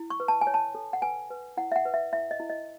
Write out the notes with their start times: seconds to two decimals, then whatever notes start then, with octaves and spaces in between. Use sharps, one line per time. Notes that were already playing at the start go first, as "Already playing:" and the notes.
Already playing: E4
0.10 C#6
0.20 B4
0.28 A5
0.41 G#5
0.47 C#5
0.54 A5
0.75 A4
0.93 F#5
1.02 B4 G#5
1.31 B4
1.57 E4 F#5
1.72 E5
1.76 F#5
1.85 B4
1.94 E5
2.13 E4 E5
2.31 D#5
2.40 E4
2.50 D#5